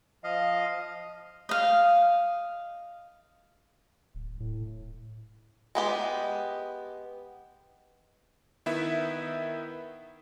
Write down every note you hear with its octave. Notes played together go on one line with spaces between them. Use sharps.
F3 D#5 F5
D#5 F5
D1
A2
G#3 B3 G4
D#3 B3 E4 E5